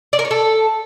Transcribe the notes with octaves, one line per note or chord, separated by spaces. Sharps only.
D5
A#4
C#5
A4